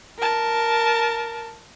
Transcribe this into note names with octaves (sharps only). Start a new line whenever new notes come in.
A#4 A5